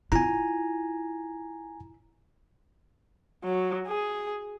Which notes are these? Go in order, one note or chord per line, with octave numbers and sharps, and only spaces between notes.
E4 F4 G#5 A#5
F#3
G#4